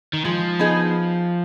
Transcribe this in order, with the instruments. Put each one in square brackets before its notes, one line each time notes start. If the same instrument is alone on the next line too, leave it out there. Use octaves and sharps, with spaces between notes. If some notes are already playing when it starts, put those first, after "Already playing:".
[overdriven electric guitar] D#3
[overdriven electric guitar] F3 [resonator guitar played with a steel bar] G#3
[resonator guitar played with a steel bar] B3 D#4 G#4